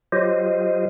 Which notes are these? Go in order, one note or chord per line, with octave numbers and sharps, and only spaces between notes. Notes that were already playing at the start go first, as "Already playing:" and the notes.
F#3 F4 G4 C5 D#5